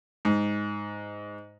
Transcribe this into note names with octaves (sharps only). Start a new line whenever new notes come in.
G#2